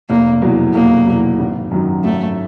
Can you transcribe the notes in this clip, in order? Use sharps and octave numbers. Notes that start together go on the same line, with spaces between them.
F1 A#3
E2 B2 F#3
F1 A#3
E2 B2 F#3
G#1
F#2 D#3 F#3
G#1 A3